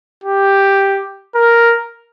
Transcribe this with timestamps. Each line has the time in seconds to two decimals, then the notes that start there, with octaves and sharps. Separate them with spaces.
0.24 G4
1.35 A#4